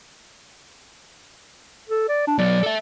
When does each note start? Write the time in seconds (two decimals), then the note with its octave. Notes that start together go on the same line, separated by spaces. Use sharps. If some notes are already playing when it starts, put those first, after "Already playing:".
1.90 A4
2.09 D5
2.27 D4
2.39 F#3 B3 D5
2.63 A4 E5